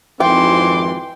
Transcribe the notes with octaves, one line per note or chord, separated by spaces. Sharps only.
G#1 F2 E3 G5 C6 D6